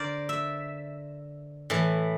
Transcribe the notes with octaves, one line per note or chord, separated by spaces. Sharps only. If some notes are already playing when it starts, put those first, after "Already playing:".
Already playing: D3 A#4 C5 D5
E5
A2 E3